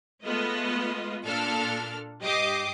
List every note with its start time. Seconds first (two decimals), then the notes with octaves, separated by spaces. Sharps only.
0.24 G#3 A3 B3 F4 B4 D#5
1.25 A#2 D4 A4 F6
2.21 G2 G4 D#5 D6 D#6 C7